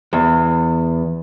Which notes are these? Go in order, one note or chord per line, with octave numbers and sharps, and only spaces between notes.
E2